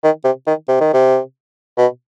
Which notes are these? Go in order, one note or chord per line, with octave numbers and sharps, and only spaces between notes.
D#3
C3
D#3
C3
D#3
C3
B2